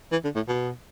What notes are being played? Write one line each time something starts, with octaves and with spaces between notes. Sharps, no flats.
E3
D3
A2
B2